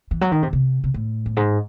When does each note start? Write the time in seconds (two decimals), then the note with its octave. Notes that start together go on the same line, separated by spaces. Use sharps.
0.11 E3
0.21 F#3
0.32 D#3
0.43 C3
0.53 C3
0.84 C3
0.94 A2
1.26 F#2
1.37 G#2